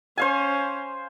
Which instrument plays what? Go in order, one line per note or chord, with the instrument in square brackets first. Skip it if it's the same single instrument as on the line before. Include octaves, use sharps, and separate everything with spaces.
[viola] C#4 [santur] C5 F5 G#5